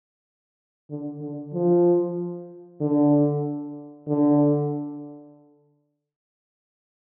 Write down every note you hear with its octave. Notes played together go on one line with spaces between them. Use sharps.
D3
D3
F3
D3
D3